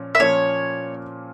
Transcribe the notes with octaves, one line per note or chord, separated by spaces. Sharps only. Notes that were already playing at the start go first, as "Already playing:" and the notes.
Already playing: A#2 F3 C#4
E5
A#2 F3 A#3 C#4 C#5